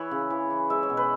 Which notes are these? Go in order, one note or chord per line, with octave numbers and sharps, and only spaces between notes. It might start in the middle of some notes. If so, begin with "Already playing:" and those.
Already playing: E3 B4 C#5 E5
C#3
E3
E3
G#3 E5
C#5
B2
B4